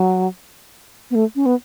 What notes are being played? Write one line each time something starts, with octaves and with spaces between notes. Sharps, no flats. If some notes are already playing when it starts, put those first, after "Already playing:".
Already playing: F#3
B3
A3
C#4
B3